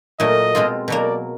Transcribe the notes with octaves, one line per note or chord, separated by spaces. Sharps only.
A#2 F#3 A3 D#5
B2 G#3 C4 F4
B2 F#3 A#3 D5